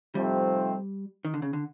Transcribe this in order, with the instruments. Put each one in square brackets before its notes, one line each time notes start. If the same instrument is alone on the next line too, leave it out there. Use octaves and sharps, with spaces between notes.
[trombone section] C3 F3 A3 C4 D#4 [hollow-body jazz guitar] G3
[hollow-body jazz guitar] D#3
D3
C#3
D3